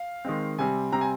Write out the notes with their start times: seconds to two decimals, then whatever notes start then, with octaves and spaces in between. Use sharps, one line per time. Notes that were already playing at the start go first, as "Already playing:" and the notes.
Already playing: F5
0.25 D#3 G#3 C4
0.58 C3 G3 C4 G#5
0.92 C3 G3 C4 A#5
1.01 G#5